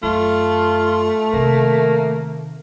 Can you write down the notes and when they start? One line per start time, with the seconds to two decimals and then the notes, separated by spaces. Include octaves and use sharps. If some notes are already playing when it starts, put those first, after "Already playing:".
0.03 F#2 A3 F4
1.33 C3 D#3 A#3